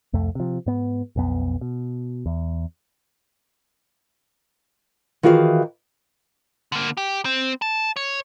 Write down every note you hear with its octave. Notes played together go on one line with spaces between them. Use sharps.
C2 F2 A3
C3 F3
G#2 B3
B1 F2 B3
B2
E2
D#3 E3 F4 F#4 G#4 F5
D3 A#3
G4
C4
A5
C#5